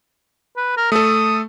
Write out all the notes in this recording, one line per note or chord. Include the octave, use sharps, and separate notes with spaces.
B4
A#4
A3 A4 D#6